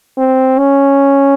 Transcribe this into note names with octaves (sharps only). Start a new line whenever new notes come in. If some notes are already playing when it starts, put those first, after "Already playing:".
C4
C#4